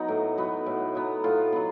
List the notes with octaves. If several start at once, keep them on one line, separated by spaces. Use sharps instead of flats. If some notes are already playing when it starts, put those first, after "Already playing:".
Already playing: F#3 B3 D#4
A2
F#3 B3
A2
F#3 B3
A2 F4
F#3 B3